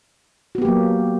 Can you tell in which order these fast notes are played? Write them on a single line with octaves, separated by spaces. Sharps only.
F#4 B3 G4 A#3 F#3